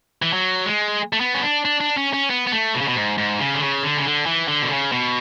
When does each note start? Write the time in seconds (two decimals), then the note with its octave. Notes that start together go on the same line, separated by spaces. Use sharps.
0.22 E3
0.33 F#3
0.66 G#3
1.13 A3
1.20 B3
1.34 C#4
1.42 D4
1.65 D4
1.80 D4
1.97 C#4
2.13 C#4
2.30 B3
2.47 B3
2.52 A3
2.74 B2
2.81 C#3
2.88 B2
2.96 G#2
3.18 G#2
3.39 C#3
3.54 D3
3.61 C#3
3.83 D3
3.97 C#3
4.06 D3
4.26 E3
4.48 D3
4.62 B2
4.70 C#3
4.92 B2